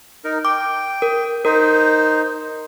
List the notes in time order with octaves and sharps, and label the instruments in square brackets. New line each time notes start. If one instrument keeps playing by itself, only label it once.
[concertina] D#4 A#4
[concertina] G5 [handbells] D6
[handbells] A#4
[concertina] D#4 C5 [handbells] A#4